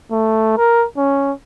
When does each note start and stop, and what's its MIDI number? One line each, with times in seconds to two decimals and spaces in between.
0.12 0.55 57
0.58 0.86 70
0.97 1.32 61